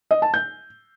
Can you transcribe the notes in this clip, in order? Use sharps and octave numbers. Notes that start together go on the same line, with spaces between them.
D#5
A5
G6